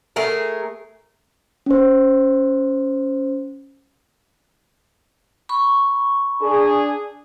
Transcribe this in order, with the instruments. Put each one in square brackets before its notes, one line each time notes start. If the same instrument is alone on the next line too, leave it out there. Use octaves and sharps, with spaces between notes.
[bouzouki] A3 G#4 A#4
[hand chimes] C#4 C5
[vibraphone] B5 C#6
[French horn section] D4 G#4